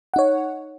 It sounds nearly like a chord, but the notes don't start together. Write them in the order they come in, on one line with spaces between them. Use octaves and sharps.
F#5 D#4 C#5